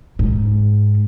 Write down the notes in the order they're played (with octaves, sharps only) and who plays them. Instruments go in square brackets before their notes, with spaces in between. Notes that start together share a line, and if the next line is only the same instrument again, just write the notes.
[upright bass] G#2